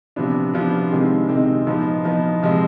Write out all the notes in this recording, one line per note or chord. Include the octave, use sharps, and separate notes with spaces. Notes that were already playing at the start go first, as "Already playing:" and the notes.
C3 F3 B3 D4
C3 F3 B3 D4
C3 D#3 G#3 C4
C3 D#3 G#3 C4
F3 B3 D#4
F3 B3 D#4
C3 F3 G#3